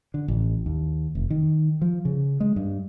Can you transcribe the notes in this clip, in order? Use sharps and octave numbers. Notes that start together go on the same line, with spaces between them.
D3
A1
D#2
F1
D#3
F3
C#3
G#3
G2